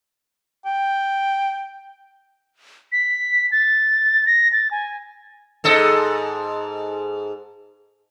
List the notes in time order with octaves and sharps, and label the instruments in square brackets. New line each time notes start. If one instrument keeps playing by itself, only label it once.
[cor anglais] G5
[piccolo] B6
A6
A#6
A6
G#5
[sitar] G#2 A4 D#5